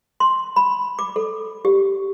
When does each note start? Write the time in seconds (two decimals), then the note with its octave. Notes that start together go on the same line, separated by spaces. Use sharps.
0.20 C6
0.56 B5
0.99 D6
1.16 A4
1.65 G4